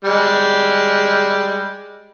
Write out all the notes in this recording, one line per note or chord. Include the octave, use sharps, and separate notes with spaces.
G3 G#3